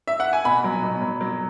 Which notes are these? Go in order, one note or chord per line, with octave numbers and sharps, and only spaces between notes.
E5
F#5
G#5
B2 B5
F#3
B2
F#3
F#3